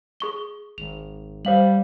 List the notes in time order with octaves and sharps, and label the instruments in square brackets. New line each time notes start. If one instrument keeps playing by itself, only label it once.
[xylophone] G#4 C#6 G7
[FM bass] G#1 [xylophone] F7
[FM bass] G3 [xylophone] C5 F5 F#7